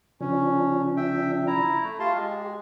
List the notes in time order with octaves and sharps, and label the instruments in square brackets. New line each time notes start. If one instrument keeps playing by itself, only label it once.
[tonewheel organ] C#3 F3 D4 [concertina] C#4
[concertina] E5 G5
E4 A#5
A3
[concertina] F4 A5 C6 [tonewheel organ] G4
[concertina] G#3